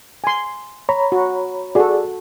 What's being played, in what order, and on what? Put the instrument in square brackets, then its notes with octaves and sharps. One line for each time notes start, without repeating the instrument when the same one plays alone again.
[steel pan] G#5 C6
[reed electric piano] C#5 A#5 B5
[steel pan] F#4
[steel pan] F#4 A4 [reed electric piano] G#4 D5